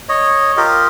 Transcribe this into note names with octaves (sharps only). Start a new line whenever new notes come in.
C#5 D#5
F4 G4 A#4 D#5